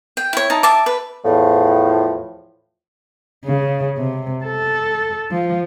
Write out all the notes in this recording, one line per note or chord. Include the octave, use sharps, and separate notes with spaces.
G5
E4 C#5
D#4 E4 A5
E5 A5 D6
B4
E2 A2 F3
C#3
C3
A4
F3